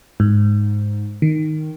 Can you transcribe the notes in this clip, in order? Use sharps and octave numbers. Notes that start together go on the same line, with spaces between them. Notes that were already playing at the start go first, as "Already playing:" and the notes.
G#2
D#3